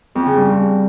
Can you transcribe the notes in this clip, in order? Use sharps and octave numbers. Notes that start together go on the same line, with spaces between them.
F2
C#3
G2